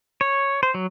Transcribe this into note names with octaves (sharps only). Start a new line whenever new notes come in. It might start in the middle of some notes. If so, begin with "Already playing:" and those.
C#5
C5
F#3